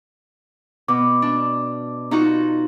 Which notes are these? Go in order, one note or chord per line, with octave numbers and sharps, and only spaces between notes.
B2 D6
D4
D#4 F4 F#4